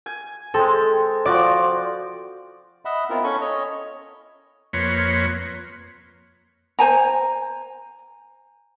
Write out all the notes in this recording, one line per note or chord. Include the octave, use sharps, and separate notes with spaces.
G#5
G#3 C4 A4
F3 F#4 D5 D6
D#5 E5 F#5 B5
B3 C4 E4 F4 A#4
C#4 A4 G#5 B5 C#6
C#5 D#5
F2 A#3 B4 C#5 C6
C5 G#5 A#5